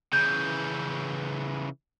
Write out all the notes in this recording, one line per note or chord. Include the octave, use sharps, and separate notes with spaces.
C#3 E3 G6